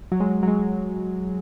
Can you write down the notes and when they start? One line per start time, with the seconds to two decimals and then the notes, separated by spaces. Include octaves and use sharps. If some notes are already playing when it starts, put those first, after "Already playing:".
0.12 F#3
0.20 G#3
0.43 F#3
0.48 G#3